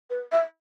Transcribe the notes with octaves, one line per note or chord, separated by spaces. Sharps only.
B4
E5